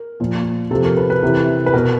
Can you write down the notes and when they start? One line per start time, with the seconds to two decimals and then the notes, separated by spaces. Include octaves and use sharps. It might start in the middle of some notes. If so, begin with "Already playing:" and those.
Already playing: A#4
0.20 A#2 F3
0.71 C3 F3 A4
0.84 A#4
0.97 B4
1.10 B4
1.23 C3 E3
1.66 B4
1.74 B2 A#4